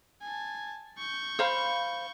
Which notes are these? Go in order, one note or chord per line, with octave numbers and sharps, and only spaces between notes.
G#5 A5
C#6 G6
C5 F5 B5